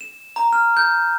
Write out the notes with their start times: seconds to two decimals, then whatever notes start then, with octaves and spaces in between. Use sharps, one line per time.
0.01 E7
0.36 A#5
0.53 F6
0.77 G6